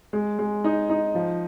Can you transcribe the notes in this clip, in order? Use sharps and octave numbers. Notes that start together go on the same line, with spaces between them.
G#3
G#3
D#4
D#4
F3